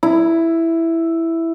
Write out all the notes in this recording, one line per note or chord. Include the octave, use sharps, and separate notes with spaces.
E4